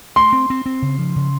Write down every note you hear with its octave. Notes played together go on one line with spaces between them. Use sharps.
A3 C6
C4
C4
C4
C#3
F3
C#3